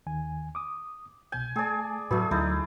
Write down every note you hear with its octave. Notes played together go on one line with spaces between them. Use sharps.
D#2 D#3 G#5
D6 D#6
C2 B2 G#5 G6
A3 G#4 D5 G#5 A5
A2 F#3 A3 F#4 G#4 B4 B5
D2 F#3 D#4 E4 D5